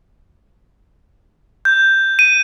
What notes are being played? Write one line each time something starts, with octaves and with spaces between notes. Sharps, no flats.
G6
D#7